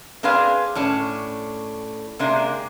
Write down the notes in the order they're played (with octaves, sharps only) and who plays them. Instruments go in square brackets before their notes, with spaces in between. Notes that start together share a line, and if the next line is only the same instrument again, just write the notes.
[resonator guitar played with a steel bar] C4 D4 G#4 B4 F5
A2 C#4 D4
C3 G#3 A#3 D4